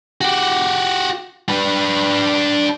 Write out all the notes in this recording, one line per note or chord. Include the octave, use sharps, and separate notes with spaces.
F#4 G4
D4 B4